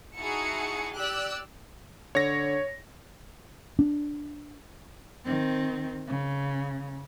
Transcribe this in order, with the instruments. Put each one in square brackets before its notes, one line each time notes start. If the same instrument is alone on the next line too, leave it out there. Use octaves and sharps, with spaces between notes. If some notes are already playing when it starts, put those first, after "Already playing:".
[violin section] D#4 E4 F#4 G#4 A5 C#7
G4 D5 E6 F#6
[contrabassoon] D3 [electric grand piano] C#5 A#6
[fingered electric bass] D4
[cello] D#3 C4
C#3